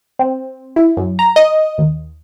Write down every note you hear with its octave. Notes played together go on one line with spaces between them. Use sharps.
C4
E4
F#2
A#5
D#5
D#2